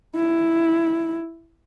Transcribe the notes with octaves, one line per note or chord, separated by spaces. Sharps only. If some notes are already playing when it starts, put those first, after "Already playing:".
E4